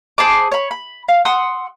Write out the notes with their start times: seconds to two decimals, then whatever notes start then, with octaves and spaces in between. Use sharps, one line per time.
0.18 G#4 C5 A5 D6
0.52 C#5 B5
0.71 B5
1.08 F5
1.25 F#5 C6 D#6 E6